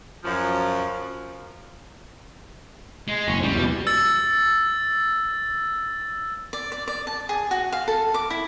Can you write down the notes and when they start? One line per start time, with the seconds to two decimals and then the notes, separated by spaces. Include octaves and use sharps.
0.24 F#2 F3
3.08 G#3
3.28 F#1 C#4
3.43 F#1 C#2 G3
3.55 E2 B2
3.87 E6 A6
6.53 D5
6.72 D5
6.88 D5
7.07 A5
7.29 G#4
7.51 F#4
7.72 F5
7.88 A4
8.14 D6
8.30 E4